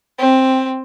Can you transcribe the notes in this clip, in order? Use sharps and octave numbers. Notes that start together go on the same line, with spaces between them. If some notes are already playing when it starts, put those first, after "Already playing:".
C4